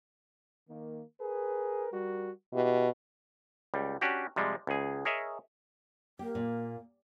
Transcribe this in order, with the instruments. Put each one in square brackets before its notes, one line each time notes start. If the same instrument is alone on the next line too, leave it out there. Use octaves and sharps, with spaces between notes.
[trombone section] D#3 A#3
G#4 A#4 B4
G3 F#4 A#4
[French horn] B2 [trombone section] E4 G4
[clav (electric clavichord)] C#2 G3
C#4 D4 F#4 G4
C3 F3 G3 G#3
C#2 G#4
G#4 A#4 C#5 D#5 E5
[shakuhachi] A#3 [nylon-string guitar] G4
[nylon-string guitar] A#2